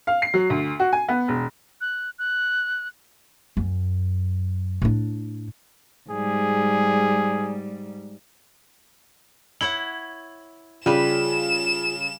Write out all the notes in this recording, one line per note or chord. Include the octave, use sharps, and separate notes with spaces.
F5
C7
F#3
D2
F#4
G#5
B3
E1
F#6
F#6
F#2
A2 D4
G#2 G3 G#4
E4 C#5 F#5 F#7
C#3 G3 F4 G#4 B4 E7